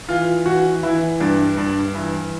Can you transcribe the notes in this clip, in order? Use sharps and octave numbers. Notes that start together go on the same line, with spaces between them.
E3 F4
E3 F#4
E3 E4
G2 D4
G2 D4
E3 E4